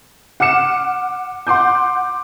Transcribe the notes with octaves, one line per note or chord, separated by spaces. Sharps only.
F#5 D6 F6 C#7 E7
F#5 C6 D6 G6